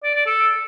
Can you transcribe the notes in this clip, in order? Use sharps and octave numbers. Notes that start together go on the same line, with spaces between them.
D5
D5
A4